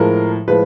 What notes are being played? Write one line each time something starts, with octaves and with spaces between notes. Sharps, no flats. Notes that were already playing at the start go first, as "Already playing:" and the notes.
Already playing: A2 F3 G#3 A#4
A2 F3 G#3 B4